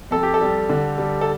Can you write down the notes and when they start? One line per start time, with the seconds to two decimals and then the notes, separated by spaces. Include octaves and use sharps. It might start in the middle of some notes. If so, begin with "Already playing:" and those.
0.11 F2 A4
0.23 G4
0.34 A4
0.41 G3
0.69 D3
0.98 G3
1.21 A4